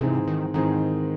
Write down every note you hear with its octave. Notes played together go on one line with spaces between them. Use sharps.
G#2 C3 E3 C4 D#4 G#4
D#3
G#2 D#3 E3 C4 D#4 G#4